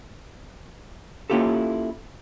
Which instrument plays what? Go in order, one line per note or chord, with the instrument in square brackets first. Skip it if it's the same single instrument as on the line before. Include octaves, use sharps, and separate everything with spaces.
[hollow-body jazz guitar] A#3 C#4 E4 F4 G4 A4